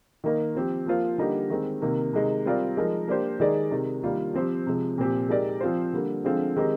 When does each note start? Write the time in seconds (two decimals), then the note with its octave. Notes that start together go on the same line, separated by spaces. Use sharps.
0.24 D#3 A#3 D#4
0.55 F3 C4 G4
0.86 F3 A#3 F4 C5
1.18 D3 G3 A#3 D#4 G4
1.50 D#3 G#3 C4
1.82 C3 D#3 A#3
2.13 C3 D#3 G#3 D#4
2.45 G3 C4 F4 A#4 D5
2.77 F3 G#3 D#4 A#4
3.08 A#3 D4 G4 C5
3.40 D#3 G#3 D#4 G#4 D5
3.71 C3 D#3 G#3
4.03 D#3 G3 A#3 D4 F4
4.34 F3 C4 G4 C5
4.67 C3 F3 G#3
4.98 A#2 F3 C4 G4
5.29 G#3 D#4 G4 A#4 D5
5.61 F3 C4 F4 C5
5.93 D3 G3 A#3
6.24 D3 F3 G#3 C4 F4
6.56 D#3 G#3 C4 D#4 G4